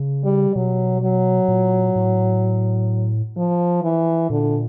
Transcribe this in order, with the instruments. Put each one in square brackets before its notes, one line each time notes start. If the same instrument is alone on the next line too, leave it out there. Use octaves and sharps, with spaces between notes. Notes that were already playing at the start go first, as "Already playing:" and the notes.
Already playing: [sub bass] C#3
[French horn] G3
[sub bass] B2 [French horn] F#3
[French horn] F#3
[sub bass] A#2
A2
[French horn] F3
E3
[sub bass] A#2 [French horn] D3